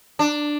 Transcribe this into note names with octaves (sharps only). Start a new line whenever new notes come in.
D4